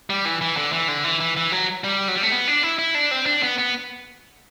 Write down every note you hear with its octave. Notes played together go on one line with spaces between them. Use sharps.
G3
E3
E3
D3
E3
D3
E3
E3
E3
F#3
G3
F#3
G3
A3
B3
D4
E4
E4
D4
C4
D4
B3
B3